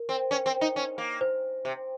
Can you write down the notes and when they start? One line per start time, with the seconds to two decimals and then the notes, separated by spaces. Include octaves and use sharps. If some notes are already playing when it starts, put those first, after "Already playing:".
Already playing: A#4
0.09 C4
0.31 C#4
0.46 C4
0.61 D#4
0.76 C#4
0.98 A#3
1.21 C5
1.65 C3